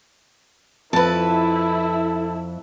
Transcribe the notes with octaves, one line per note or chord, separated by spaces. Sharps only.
F2 E4 A4 B4 A5